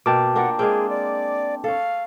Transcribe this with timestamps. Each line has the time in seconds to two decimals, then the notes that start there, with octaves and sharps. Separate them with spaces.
0.06 B2 A#3 G5 A5 D6
0.36 D4 F4 A#4 F#5
0.59 G#3 A#3 C4 G#4
0.89 D5
1.64 A4 C#5 F5